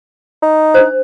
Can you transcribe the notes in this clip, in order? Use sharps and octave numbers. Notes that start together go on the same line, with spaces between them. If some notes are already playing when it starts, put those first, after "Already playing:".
D#4
D4 C5